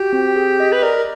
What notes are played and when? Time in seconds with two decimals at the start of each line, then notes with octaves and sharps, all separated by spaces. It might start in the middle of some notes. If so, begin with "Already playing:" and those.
Already playing: F#4 G4
0.13 C4
0.36 G#4
0.60 D#5
0.72 B4
0.83 A#4 D5